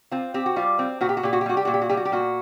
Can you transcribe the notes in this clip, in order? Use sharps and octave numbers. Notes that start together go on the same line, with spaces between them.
C4 F4
C4 G4
F#4
G3 F4
C4
A#2 F#4
G4
F#4
A#2 G4
F#4
G4
G3 F#4
G4
A#2 F#4
G4
F#4
G3 G4
F#4
G4
A#2 F#4